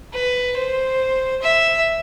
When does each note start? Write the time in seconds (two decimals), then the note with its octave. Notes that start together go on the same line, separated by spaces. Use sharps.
0.14 B4
0.58 C5
1.42 E5